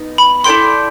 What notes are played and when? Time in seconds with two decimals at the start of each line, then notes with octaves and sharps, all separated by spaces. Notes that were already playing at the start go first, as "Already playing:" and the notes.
Already playing: B3 D#4
0.18 B5
0.44 E4 A4 D5 G5 C6